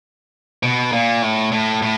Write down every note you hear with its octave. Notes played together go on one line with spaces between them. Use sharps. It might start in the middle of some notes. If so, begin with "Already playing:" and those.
B2
A#2
A2
A2
A2